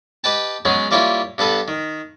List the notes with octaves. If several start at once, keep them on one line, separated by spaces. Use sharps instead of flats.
G4 B4 D#5 G5 A5
F#3 G#3 B3 C#4 G#4
G3 A#3 E4 F4 C#5 G#5
G2 B3 A4 B4
D#3